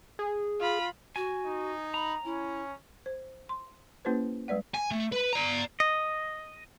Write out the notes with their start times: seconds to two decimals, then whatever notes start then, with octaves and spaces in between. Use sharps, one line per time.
0.19 G#4
0.60 F4 B5
1.16 F#4 G#5
1.46 D#4
1.94 A#5 B5
2.25 C#4 E4
3.06 C5
3.49 C6
4.05 A#3 C#4 E4 G4 B4 C5
4.48 G3 G#3 B4 D5 F#5
4.75 G#5
4.91 A3
5.12 B4
5.33 D5 A#5
5.80 D#5